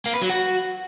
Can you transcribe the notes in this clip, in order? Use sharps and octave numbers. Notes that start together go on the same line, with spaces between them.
A#3
B4
F#3
F#4